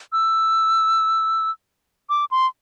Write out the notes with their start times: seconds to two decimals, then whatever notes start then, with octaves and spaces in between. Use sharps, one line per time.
0.13 E6
2.10 D6
2.31 C6